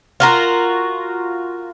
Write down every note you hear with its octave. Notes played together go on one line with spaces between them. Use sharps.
F4 F#4 A#4